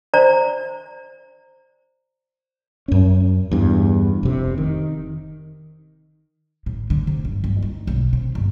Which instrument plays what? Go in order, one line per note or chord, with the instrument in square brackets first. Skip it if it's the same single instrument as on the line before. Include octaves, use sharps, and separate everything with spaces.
[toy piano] C5 D5 A#5
[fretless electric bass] F#2 C#4
E2 G2
F1 C3
D#3
[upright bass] A2
D3
C3
G2
G2
D#4
B1
C3
G1